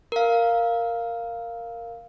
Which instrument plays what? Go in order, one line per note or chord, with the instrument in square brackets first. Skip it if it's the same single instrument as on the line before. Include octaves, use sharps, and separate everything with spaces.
[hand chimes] A#4 F5